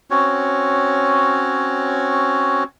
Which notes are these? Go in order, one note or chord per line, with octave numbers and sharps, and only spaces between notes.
C4 C#4 F#4 C#5